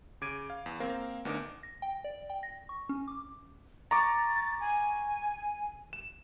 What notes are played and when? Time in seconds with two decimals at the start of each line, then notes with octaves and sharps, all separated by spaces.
0.22 C#3 D6 G#6 D7 D#7
0.50 F5
0.66 E2
0.80 A#3 C4 A#4 C5 F5
1.25 D2 B3 D4 D#4 A#4 D6
1.63 A#6
1.82 G5
2.04 D5
2.30 G5
2.43 A#6
2.69 C#6
2.89 C#4
3.08 D6
3.91 A#5 C#6 D6 A6
4.60 G#5
5.93 E7